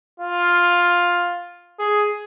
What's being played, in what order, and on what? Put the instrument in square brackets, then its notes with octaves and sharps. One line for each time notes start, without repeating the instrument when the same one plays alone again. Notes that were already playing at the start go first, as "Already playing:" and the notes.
[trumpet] F4
G#4